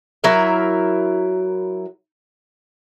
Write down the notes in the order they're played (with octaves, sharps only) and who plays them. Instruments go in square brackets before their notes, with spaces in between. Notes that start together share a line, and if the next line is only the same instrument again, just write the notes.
[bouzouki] F#3 E4 A#4 E5